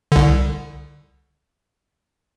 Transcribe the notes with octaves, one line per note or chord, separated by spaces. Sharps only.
C2 D3